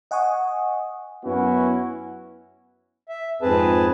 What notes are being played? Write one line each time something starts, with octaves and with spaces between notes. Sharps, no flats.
D#5 F#5 G#5 C#6 D#6
F#2 B3 C#4 E4 F#4
E5
F2 G#2 C4 G#4 B4 A5